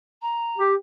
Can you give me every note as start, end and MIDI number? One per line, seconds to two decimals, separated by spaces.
0.22 0.60 82
0.58 0.74 67